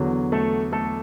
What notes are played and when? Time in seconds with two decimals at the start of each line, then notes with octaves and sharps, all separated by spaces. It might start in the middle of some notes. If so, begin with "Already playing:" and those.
Already playing: E2 D3 F#3
0.32 A3 A4
0.72 A3 A4